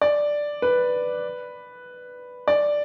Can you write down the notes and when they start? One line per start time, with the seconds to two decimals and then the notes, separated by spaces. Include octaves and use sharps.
0.01 D5
0.62 B4
2.48 D5